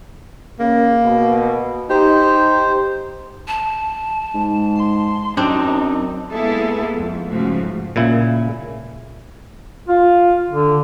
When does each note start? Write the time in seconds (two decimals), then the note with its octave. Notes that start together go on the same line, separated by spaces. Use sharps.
0.60 C#3 A#3
1.03 B2
1.90 D#4 G4 C5
3.48 A5
4.34 G#2
4.76 C6
5.37 F#2 C4 D4 D#4
6.31 G#3 A#3 B3 E4 G#4 A4
6.96 F2
7.28 G#2 C#3 F3 A3 F#4
7.96 A#2 C#3 E4
9.89 F4
10.49 D3